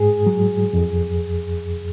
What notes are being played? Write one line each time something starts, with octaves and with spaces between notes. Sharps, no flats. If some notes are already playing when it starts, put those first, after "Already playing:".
Already playing: G#2 G#4
F#3
F2